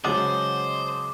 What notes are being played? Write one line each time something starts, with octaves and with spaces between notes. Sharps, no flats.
C#3 F#3 G#3 C5 D#5 F#5 A5 D6